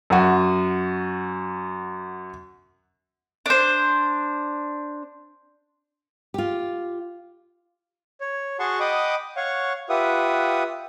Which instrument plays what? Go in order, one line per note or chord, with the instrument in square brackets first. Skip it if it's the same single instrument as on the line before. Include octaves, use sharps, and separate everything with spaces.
[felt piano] F#2 F#4
[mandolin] D4 C5
[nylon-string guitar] F4 G4
[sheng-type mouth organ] C#5
F#4 G#4 F#5 A5 C6 C#6
D#5 F#5 G5 B5 D6 D#6
C#5 F5 F#5 C#6
F4 G4 B4 E5 F#5 D#6